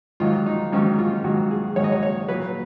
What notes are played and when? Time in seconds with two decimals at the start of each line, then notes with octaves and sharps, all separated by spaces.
0.20 G#2 D#3 F#3 F4
0.46 D#4
0.72 G#2 D#3 F#3 C#4
0.99 F4
1.24 G#2 D#3 F#3 F#4
1.51 G#4
1.76 G#2 D#3 F#3 C#5
1.84 D#5
1.92 C#5
2.03 C#5
2.29 A#2 F#3 B4